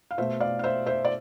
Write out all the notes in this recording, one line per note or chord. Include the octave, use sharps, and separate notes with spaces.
F5
B2 A3 C5 E5
D5 F5
F5
C5 E5
C5 E5
D5